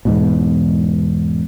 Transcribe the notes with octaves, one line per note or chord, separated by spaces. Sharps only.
E2 G#2 B2